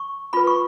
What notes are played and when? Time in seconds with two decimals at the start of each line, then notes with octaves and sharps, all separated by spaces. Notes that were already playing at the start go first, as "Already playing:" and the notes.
Already playing: C#6
0.33 F4 B4 B5
0.47 C#6